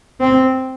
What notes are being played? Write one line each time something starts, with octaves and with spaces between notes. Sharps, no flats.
C4